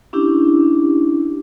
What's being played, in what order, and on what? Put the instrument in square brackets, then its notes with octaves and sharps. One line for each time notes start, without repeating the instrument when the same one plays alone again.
[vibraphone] C#4 D4 E4 G4